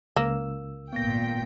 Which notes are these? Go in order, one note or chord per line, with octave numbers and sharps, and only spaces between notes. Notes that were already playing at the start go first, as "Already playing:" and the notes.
C#2 A#3 E6
G#1 A#2 B3 G5 A#6